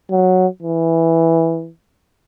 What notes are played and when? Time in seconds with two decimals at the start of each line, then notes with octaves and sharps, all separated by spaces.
0.11 F#3
0.62 E3